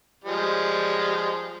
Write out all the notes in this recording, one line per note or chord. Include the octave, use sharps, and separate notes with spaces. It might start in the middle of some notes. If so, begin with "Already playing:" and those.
F3 G3 G#3